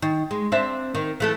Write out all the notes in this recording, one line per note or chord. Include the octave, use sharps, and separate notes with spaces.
D#3
G#3
C4 D4 E5
D#3
E3 A3 A4